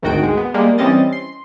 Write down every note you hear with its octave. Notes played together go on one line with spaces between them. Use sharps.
G#1 D2 D#3 F#4 G5 D7
G#3
B3
G3 G#3 A#3
E3 G3 C4 C#4 D#5 A6
C6